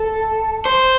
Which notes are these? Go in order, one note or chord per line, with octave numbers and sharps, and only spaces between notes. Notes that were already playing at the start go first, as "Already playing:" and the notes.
Already playing: A4
C5